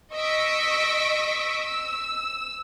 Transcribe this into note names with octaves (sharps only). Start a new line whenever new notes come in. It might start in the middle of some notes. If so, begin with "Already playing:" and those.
D#5 C#6 D#6 E6 B6 D7
E6